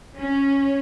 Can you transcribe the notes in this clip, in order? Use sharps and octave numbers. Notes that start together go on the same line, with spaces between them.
C#4